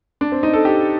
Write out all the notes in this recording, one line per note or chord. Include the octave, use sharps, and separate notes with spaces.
D4
C4
D#4
A4
G4